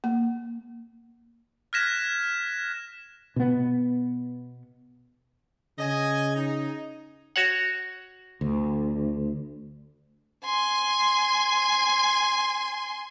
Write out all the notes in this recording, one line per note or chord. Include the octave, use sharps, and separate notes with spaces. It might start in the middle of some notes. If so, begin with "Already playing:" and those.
A#3
F6 F#6 G#6 A#6 B6 E7
B2 B3
C#3 D#5 G#5
D#4
F#4 C#5 F#5
D2
G#5 C6